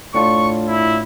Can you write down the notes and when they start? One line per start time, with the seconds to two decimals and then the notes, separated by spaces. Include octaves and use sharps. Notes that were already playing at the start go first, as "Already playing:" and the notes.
0.14 A2 D4 F4 C#6
0.67 E4